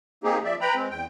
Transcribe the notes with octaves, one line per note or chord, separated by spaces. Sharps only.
A#3 C4 D#4 G4 G#4
F3 D5 E5
B4 G5 A#5 B5
G#3 C4
E2 G5